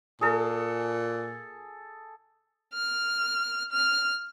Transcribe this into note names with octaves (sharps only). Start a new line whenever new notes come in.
A#2 G#4 A4
F6
F6